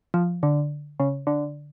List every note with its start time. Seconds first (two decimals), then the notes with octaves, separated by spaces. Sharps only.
0.14 F3
0.43 D3
1.00 C#3
1.27 D3